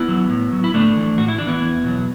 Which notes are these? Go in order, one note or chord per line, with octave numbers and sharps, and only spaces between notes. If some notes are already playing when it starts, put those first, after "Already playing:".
Already playing: B3 E4
F#3
A2
F#3
E4
A2 A3 D4
E3
A2 F#4
E4
E3 D4
B3 E4
E2
B2 F#3